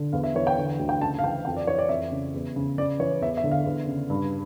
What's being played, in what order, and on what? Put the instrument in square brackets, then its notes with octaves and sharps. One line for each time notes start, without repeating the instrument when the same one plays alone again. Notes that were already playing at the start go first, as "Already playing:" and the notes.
Already playing: [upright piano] D3
E2 F5
E5
E3 C#5
G5
D3
D2
G5
C#3 A5
F5
E3 G5
F2 G5
D5
E3 C#5
D5
F2 E5
C#3
E2
C#3
C#3 D5
E3 C#5
E2 E5
E5
D3
F5
E2
C#3
G2